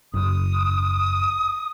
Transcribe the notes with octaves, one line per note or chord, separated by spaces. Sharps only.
F#1 D#6